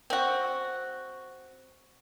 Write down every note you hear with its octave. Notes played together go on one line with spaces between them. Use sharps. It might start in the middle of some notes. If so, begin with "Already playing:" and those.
C4 F#4